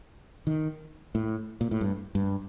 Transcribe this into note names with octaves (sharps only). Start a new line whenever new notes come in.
D#3
A2
A#2
A2
G2
G2